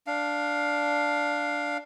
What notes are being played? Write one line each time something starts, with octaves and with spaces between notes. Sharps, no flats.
D4 F5